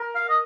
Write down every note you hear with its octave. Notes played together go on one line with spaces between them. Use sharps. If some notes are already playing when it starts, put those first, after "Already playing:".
Already playing: A#4
F5
D#5